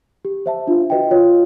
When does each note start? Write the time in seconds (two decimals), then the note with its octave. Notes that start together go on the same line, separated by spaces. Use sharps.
0.25 G4
0.46 C5 E5 A5
0.67 D4 F4
0.90 F#4 B4 D#5 G5
1.11 F4 C#5